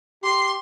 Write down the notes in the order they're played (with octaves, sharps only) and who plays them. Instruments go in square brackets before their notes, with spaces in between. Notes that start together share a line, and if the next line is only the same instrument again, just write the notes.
[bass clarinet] G4 [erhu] C6